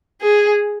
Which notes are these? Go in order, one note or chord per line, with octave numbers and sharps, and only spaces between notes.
G#4